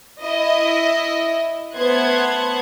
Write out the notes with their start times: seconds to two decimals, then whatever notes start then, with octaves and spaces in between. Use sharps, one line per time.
0.23 E4 D#5
1.76 A3 B3 C5 F#6 G#6